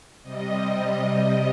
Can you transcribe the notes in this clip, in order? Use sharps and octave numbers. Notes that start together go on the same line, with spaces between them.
C3 G3 D#5